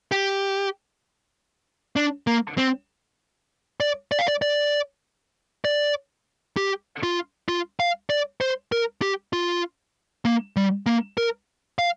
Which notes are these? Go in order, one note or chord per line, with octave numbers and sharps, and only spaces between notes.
G4
D4
A#3
C4
D5
D5
F5
D5
D5
D5
G4
F4
F4
F5
D5
C5
A#4
G4
F4
A#3
G3
A#3
A#4
F5